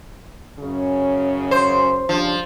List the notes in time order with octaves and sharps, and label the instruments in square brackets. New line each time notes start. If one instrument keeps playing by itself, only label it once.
[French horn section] F#2 C#3 C#4
[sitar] C5
[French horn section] C#3 G3 D4 [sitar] F3